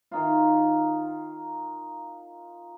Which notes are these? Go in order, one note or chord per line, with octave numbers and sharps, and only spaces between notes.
D#3 D#4 F4